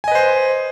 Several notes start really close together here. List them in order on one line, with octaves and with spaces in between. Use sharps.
G#5 D#5 B4 C5